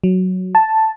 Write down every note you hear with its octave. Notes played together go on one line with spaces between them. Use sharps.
F#3
A5